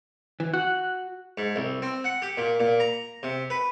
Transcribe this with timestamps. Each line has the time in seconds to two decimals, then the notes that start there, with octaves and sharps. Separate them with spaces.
0.40 E3
0.54 F#4 F#6
1.38 G#2
1.56 C2
1.82 C4
2.04 F#5
2.22 G4
2.37 A#2
2.60 A#2
2.80 A#5
3.23 C3
3.50 B4